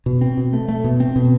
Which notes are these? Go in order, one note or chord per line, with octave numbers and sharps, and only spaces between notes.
B2
C4
B2
A3
A3
B2
C4
B2